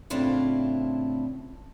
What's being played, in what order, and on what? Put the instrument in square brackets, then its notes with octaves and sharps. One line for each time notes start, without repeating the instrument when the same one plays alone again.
[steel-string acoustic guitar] A2 C#3 C4 D4 E4 F4